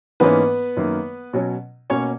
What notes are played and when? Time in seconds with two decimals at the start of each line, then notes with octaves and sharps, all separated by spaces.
0.20 G#2 E3 A#3 B3 C#4 B4
0.77 F#2 D#3 A#3
1.33 B2 F#3 C#4
1.90 B2 A#3 C#4 C#5